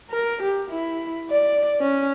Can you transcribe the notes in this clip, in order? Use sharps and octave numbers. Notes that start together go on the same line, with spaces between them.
A#4
G4
E4
D5
C#4